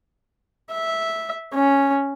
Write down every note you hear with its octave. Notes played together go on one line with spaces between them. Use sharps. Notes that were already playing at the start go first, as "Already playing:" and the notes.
E5
C#4